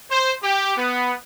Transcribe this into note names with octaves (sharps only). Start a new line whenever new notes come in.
C5
G4
B3